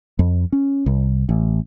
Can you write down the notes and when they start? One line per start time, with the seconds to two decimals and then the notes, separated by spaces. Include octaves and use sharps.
0.19 F2
0.52 C#4
0.86 C2
1.29 A1